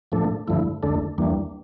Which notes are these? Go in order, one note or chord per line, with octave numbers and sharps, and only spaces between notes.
A2 F3 A3 D4 A4
G2 D3 F3 A3 E4
E2 D3 A3 D4 A4
E2 E3 G3 A#3 D4